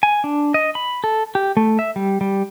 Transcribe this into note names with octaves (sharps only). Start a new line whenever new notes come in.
G#5
D4
D#5
B5
A4
G4
A3
E5
G3
G3